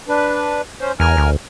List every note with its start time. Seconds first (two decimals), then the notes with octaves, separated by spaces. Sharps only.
0.08 D4 B4
0.81 C#4 C5
1.00 E2 A#4 G#5 F6
1.17 D2